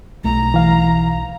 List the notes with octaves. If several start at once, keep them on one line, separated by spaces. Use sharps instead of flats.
B1 A3 A#5
E3 F5